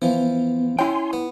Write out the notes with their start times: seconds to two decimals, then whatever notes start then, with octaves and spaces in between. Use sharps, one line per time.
0.02 E3 F3 B3
0.79 C#4 E4 G5 G#5 C6
1.13 B3